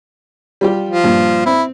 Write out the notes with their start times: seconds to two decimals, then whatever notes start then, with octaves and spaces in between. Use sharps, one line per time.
0.61 G3 F4 G4
0.89 F3
1.04 G2 A#2
1.46 C4 E4